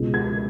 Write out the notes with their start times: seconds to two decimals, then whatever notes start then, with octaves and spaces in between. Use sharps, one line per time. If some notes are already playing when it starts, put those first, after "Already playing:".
Already playing: C#2 B2 G#3 C#4
0.14 G#6